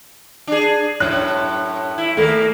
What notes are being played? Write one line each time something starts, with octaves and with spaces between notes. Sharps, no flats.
D4 G#4
F#2 A2 C#5 F#6
E4
D#2 A3 A#3